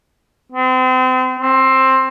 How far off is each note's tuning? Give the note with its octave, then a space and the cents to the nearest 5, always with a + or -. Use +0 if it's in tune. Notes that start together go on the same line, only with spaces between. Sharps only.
C4 -35
C4 +15